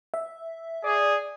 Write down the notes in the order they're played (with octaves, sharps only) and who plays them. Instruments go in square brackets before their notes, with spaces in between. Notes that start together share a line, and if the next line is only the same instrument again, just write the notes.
[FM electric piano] E5
[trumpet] G#4 [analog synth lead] D5